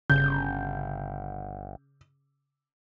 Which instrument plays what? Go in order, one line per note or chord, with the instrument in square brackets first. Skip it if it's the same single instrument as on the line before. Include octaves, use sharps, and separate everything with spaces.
[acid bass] G1 [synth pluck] C#3 [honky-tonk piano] G6